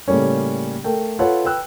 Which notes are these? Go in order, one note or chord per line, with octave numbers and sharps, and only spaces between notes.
A2 C#3 G3 A#3 C#4
A3 A#4 G5
F4 A4 B4 C#5 F#5
B4 G5 E6 F#6